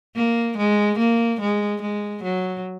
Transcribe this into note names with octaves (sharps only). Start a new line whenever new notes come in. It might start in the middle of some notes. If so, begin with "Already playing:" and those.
A#3
G#3
A#3
G#3
G#3
F#3